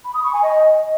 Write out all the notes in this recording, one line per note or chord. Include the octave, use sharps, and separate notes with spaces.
B5
D#6
C#6
G#5
D#5